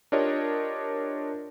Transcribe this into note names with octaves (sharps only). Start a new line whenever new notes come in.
D4 F4 G4 A#4 C#5 D#5